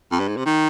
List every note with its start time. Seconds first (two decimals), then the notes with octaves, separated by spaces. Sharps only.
0.11 F2
0.20 G2
0.28 G#2
0.36 C3
0.45 D#3